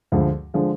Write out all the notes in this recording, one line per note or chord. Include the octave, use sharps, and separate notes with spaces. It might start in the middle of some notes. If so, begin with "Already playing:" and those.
D2 D3 F3 G#3
D3 F3 G#3